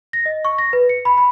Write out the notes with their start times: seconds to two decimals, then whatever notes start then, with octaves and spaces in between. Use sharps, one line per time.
0.13 A#6
0.26 D#5
0.45 C#6
0.58 A#6
0.73 B4
0.89 C#7
1.05 B5
1.17 B5